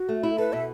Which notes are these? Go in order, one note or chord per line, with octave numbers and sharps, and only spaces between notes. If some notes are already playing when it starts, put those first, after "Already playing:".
Already playing: F#4
A3
E4
A4 B4
B2 E5